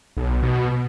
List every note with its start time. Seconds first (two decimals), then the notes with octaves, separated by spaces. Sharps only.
0.17 B1
0.43 B2